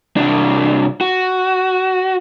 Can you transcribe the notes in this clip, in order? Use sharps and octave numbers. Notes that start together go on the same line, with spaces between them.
C2 D4
F#4